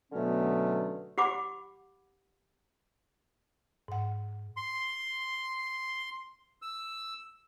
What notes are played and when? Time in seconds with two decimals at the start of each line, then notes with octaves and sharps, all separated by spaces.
0.12 B2 D3 F#3 A3 B3 C#4
1.18 G4 F#5 B5 D6
3.88 G#2 F#5
4.57 C6
6.62 E6